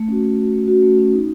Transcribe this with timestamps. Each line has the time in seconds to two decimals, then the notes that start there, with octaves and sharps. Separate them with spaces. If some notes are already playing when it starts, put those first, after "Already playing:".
Already playing: A3
0.08 C#4 F#4
0.24 A3
0.38 C#4 F#4
0.52 A3
0.68 C#4 F#4
0.83 A3
0.98 C#4 F#4
1.13 D#4